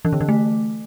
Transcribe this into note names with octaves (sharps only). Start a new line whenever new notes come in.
E3
D3
E3
A3